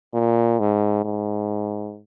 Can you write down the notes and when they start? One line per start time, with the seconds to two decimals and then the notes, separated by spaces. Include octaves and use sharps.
0.14 A#2
0.60 G#2
1.04 G#2